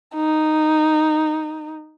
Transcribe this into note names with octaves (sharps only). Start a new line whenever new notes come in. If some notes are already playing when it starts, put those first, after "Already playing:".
D#4